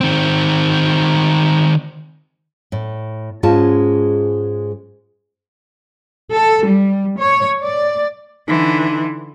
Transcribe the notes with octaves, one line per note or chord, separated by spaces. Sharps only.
D#3 C4
A2
G#2 G#3 C#4 F4 A5
A4
G3
C#5
D5
D3 E3 D#4 C6